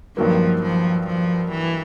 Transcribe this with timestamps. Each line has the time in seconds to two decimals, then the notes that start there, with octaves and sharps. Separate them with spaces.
0.16 G2 D#3 F3 F#3 A#3
0.63 F3
1.07 F3
1.52 E3